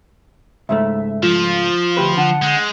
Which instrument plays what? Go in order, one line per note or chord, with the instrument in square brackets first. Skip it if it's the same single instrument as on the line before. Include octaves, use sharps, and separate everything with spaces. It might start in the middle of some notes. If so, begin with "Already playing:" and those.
[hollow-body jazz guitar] C#2 G#2 A3 [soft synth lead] E5
[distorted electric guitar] F3 [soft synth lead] F4
[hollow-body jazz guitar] D2 G4 B4
[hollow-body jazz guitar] D3 [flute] F#5 [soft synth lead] A5
[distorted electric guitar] G#3 [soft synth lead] G6